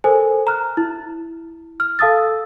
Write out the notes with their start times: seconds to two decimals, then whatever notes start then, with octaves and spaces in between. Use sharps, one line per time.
0.04 A4 A#4 C5 G#5
0.47 A#5 F6 F#6
0.77 E4
1.80 F6
1.99 A4 F5 A5 D#6 E6 A6